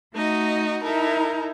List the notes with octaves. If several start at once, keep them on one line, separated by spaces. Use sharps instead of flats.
A3 D#4 F#4 D#5
D#4 E4 A4 A#4